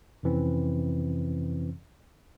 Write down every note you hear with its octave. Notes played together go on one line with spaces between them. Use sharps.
F2 C3 E3 C4 C#4